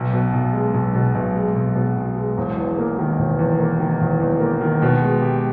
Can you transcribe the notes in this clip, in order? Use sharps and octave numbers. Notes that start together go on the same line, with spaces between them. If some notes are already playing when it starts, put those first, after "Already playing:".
Already playing: B1
B2
B1
G#3
B1
B2
B1
G#3
B1
B2
B1
G#3
E1
E2
A#3
D#3
E1
E2
A#3
D#3
E1
E2
A#3
D#3
B2
G#3
G4